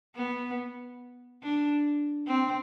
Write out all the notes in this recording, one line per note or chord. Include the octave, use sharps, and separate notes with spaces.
B3
D4
C4